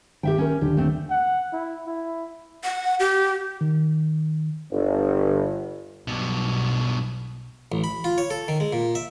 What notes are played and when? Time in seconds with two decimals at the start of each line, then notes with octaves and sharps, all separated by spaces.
0.23 G#1 G4 E5 G5
0.38 C#4 A#4
0.61 D#1 D3 G4
0.77 A3 C4
1.10 F#5
1.53 E4
1.87 E4
2.64 F#5
3.00 G4
3.61 D#3
4.72 G1
6.08 B1 G2 B2
7.72 A1
7.84 B5
8.04 F4
8.18 C#5
8.30 A4
8.48 D#3
8.60 G#3
8.73 A#2
8.95 E5